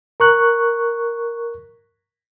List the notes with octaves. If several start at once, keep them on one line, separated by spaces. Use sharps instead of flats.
A#4 C#6 F#6